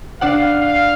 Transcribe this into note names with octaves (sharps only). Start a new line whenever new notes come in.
D4 D5 F5 F#5
F5